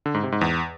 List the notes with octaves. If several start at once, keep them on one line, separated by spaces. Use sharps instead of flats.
D3
G#2
C3
G#2
E2